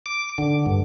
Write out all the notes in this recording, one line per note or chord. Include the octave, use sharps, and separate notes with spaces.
D6
D3
G2